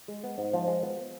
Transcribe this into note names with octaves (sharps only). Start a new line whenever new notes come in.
G#3
B3
G#2
F3
G#3
B3